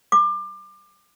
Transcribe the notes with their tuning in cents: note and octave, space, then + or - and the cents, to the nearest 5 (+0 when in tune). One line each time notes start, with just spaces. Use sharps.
D6 +30